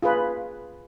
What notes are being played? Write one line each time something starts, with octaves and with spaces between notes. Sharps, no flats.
F4 G#4 B4